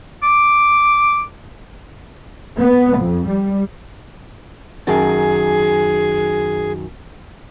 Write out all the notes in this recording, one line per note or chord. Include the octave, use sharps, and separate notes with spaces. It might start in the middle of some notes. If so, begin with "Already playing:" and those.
D6
B3
F2
G3
F#2 D#3 G#4 A5